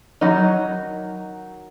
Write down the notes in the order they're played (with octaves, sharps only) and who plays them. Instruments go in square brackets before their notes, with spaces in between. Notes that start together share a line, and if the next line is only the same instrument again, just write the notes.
[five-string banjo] D#3 F#3 D#4